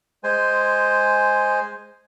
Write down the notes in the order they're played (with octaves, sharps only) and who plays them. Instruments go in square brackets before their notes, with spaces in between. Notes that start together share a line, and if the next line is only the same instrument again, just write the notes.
[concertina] G#3 C5 G#5